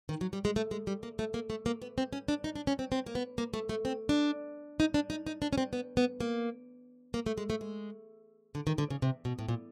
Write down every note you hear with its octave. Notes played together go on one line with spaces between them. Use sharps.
D#3
F#3
G3
G#3
A3
G#3
G3
A#3
A3
A#3
A3
A#3
B3
C4
C#4
D4
D#4
D4
C#4
C4
C4
A#3
B3
A#3
A3
A3
C4
D4
D#4
D4
D#4
D#4
D4
C#4
C4
B3
B3
A#3
A#3
A3
G#3
A3
G#3
D3
D#3
D3
C#3
C3
B2
A2
A#2